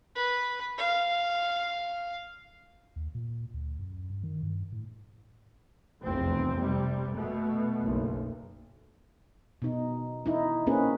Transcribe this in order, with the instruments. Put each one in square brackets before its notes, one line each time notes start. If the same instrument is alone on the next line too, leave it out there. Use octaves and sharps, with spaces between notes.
[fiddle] B4
F5
[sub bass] D#2
A#2
D2
F#2
G2
D#3
G2
A2
[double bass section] F1 B1 E2 C4
C3 G3
B2 A3
F#1 B1
[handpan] B2 D#4
D#4 E4
A#3 C4 C#4 D#4 G#4 B4